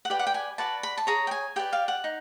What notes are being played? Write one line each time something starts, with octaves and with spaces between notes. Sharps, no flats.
F#5
G4 B4 D5 G5
F#5
G5
G#5
F#4 B4 D5 A5
B5
A5
G#4 C#5 A#5
G5
G#5
G4 B4 D5 G5
F5
F#5
D#4